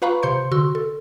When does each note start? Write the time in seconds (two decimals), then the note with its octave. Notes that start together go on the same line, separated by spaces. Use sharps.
0.02 F4 B4 F5 A#5 B5 C#6
0.23 C3 C5 C6 G6 C#7
0.52 D3 F#4 C6 E6
0.75 A4